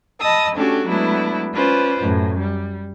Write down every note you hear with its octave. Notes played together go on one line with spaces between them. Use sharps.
D#5 A5 B5 D#6 E6
A3 C#4 D4 F#4 G4 A4
F#3 G#3 A3 B3 D4 E4
C#4 F4 B4 C5 D5
F#2 A2
G3